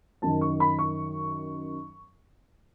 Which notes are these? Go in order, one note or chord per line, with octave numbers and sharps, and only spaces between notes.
F#2 D#3 A5
C#6
B5
C#6